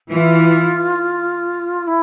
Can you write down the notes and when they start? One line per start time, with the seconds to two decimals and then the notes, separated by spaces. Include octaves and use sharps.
0.11 E3 F4
1.87 E4